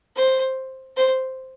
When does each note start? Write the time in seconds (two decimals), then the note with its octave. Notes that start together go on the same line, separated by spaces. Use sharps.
0.16 C5
0.97 C5